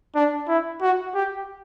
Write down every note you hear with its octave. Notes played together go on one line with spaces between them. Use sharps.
D4
E4
F#4
G4